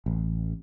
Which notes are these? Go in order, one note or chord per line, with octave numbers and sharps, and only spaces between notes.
A1